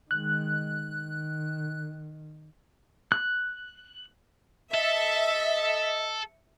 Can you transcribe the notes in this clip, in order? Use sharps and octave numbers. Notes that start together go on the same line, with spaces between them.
D#3 G#3 F#6
D#3
F#6
A4 D#5 E5